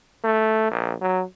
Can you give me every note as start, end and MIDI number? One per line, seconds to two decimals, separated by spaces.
0.24 0.70 57
0.71 0.94 34
1.01 1.23 54